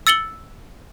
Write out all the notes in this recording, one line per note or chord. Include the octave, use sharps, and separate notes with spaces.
E6 A6 C#7 F#7 G7